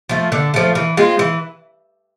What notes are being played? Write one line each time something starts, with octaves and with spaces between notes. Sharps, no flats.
F3 A3
D3
F3 A3
E3
G#3 C4 F4
E3